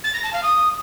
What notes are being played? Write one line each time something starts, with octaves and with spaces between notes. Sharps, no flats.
A6
A#6
A5
F5
D#6